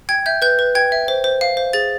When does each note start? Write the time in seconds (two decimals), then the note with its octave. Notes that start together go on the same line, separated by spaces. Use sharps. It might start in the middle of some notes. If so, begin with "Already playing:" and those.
0.09 G5 G#6
0.26 E5 G6
0.42 B4 G6
0.59 B4
0.75 G5 G#6
0.92 E5
1.08 C5
1.24 C5
1.41 F5
1.57 C5
1.73 G#4 A6